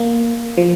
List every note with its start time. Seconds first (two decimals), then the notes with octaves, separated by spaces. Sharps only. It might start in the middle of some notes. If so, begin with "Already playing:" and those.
Already playing: A#3
0.57 F3